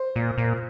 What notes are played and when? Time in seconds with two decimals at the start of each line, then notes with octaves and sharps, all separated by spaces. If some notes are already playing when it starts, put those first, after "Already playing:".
Already playing: C5
0.16 A#2
0.38 A#2